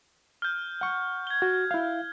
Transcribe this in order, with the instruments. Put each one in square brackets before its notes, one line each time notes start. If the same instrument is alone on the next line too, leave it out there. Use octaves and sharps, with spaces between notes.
[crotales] F6 G6
[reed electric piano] F#5 C#6
[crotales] G#6 G7
[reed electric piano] F#4
E4 F5